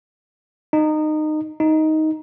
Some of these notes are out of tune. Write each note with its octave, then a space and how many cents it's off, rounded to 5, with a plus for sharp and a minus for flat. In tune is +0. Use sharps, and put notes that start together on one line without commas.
D#4 -20
D#4 +10